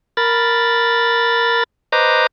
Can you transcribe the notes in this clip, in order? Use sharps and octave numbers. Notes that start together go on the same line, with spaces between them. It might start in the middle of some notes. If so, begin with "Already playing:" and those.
A#4 B5 A6
B4 C5 D#5 A#5 D6